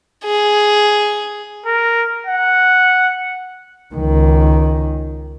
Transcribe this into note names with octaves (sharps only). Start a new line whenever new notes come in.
G#4
A#4
F#5
C#2 D#3